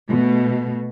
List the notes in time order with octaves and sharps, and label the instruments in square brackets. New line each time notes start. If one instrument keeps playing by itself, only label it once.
[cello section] B2 A3